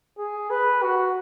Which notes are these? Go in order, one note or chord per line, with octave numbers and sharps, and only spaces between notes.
G#4
B4
F#4